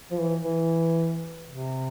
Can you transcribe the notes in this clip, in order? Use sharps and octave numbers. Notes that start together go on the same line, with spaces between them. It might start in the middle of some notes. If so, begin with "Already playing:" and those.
F3
E3
E3
C3